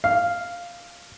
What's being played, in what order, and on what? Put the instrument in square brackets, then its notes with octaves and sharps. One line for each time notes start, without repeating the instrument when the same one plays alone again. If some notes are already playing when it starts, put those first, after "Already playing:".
[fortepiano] F5